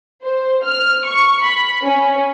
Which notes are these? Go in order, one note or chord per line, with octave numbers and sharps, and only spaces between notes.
C5
F6
C#6
B5
C#4